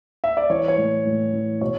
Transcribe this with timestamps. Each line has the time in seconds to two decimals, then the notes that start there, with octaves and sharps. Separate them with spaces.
0.24 E5
0.37 D5
0.50 E3 C#5
0.68 C#5
0.77 A2
1.06 A2
1.33 E3
1.61 B2 C#5